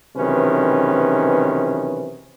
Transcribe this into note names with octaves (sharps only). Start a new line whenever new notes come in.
B1 C3 D#3 E3 C#4 B4